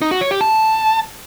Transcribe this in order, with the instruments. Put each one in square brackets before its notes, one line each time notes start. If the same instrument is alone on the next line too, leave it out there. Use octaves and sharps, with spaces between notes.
[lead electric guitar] D#4
F#4
C#5
G4
A5